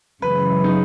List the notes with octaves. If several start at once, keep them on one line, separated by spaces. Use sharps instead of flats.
F#2 C#3 E3 G#3 B4
D#4